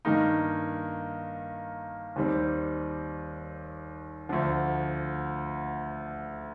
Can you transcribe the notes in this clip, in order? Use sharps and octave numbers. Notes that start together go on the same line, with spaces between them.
G2 D#3 A#3 D#4
D#2 D#3 G3 C4
D2 D3 F3